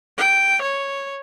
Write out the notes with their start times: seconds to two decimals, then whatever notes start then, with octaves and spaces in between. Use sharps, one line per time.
0.18 G5
0.62 C#5